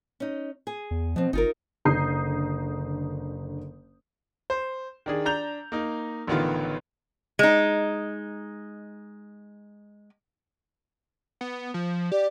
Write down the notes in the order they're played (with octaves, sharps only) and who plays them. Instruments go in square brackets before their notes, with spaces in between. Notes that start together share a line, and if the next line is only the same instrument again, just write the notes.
[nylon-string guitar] C#4 D#4
G#4
[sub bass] E2
[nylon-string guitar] B2 C4 [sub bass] F3
[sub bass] G1 [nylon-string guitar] D#4 F4 A#4
[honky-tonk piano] F#1 D3 A#5 D#6 G6 C7
[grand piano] C5
D#3 D4 G#4
D4 A#5 G6 F7
A#3 D#4
A1 D3 D#3 B3 F4
[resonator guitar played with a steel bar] G#3 D#4
[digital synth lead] B3
F3
[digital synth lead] G4 [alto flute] D5